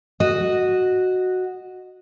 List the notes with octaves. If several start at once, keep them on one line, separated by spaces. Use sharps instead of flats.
F#4 D#5